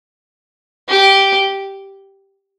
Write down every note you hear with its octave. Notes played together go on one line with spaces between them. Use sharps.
G4